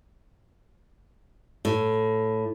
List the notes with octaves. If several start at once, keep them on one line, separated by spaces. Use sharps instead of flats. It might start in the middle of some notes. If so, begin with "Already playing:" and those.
A2